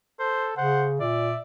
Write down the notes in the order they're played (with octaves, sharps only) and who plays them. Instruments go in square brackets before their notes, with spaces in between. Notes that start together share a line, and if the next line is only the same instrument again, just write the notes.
[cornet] A4 [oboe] C5
[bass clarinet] C#3 [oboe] C5 [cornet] F#5
[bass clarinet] A#2 [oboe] D5 [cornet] E5